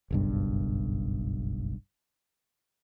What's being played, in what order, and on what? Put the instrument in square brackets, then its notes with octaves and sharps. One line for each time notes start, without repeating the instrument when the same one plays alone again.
[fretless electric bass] F#1 B1 G2